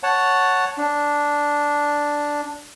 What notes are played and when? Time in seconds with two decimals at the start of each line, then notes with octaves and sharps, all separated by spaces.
0.03 C#5 F#5 A5
0.78 D4